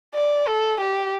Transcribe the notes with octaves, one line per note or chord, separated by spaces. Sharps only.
D5
A4
G4